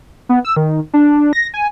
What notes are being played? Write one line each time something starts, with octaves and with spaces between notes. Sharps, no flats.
B3
E6
D#3
D4
A#6
G#5